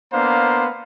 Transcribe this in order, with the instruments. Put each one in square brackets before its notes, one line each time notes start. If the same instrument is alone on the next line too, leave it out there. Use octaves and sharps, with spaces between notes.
[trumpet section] A#3 B3 D4 C5 F5 A#5